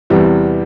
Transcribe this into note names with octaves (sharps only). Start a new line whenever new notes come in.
E2 C3 E3 G3 B3